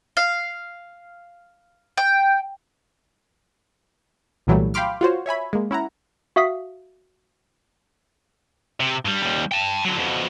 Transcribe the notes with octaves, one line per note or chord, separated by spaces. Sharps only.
F5
G5
C2 A#2 E3 F#3 G3 A3
F5 G5 B5 C6 D6 F6
F4 F#4 C5 C#5
C#5 E5 G#5 B5
G#3 A#3
C#4 E4 F#5 A#5
F#4 E5 F5 D#6 B6
C3
G2 G3
D#2 G3
G5 A5
D3 F#3
F2 B2